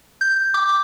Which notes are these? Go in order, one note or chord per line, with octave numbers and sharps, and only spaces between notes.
G6
D6